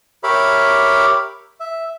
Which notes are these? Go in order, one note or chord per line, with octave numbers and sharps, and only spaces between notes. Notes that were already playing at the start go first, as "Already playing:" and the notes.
G4 A#4 C#5 E5 B5 D6
E5